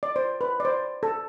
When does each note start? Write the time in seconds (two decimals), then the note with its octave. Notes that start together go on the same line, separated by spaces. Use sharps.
0.03 D5
0.16 C5
0.41 B4
0.60 D5
0.65 C5
1.03 A4